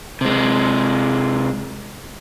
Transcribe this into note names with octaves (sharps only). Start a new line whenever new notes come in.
C3 G#3